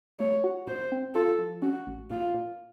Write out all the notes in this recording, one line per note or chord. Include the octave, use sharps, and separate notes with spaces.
A3 C#5
F#4
A#2 C5
C4
F4 A4
F3
C#4 F#4
A1
A#2 F4
A#2